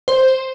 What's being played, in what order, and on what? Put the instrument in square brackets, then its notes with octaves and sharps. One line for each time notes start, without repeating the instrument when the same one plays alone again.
[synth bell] C5